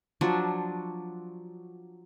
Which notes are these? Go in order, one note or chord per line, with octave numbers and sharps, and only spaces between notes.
F3 F#3 D4